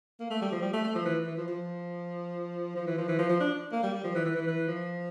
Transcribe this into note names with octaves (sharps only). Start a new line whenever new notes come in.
A#3
A3
G3
F3
G3
A3
A3
F3
E3
E3
F3
F3
F3
E3
F3
E3
F3
F3
D4
A#3
G3
G3
F3
E3
E3
E3
E3
F3